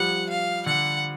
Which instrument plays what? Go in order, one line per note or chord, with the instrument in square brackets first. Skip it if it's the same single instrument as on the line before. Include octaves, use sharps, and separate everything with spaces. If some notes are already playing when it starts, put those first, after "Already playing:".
Already playing: [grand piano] F3 G3 [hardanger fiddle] F#5
[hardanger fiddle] F5
[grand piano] D3 [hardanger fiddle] F#5